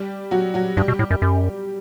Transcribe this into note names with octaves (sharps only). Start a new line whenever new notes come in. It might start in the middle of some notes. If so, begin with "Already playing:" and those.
Already playing: G3 G4
F#3 F#4
F#3 F#4
G2 G3 G4
B2
A2
F#2
F#2